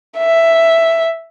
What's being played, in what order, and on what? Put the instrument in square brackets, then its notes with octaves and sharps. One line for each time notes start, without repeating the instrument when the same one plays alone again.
[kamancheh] E5